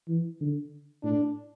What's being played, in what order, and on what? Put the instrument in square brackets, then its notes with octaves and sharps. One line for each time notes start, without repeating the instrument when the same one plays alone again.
[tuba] E3
D3
[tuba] A2 [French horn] D4